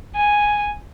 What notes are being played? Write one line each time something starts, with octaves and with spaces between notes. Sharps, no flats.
G#5